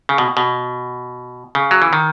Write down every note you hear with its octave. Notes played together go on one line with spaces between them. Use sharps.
C#3
B2
B2
C#3
F#3
E3
D#3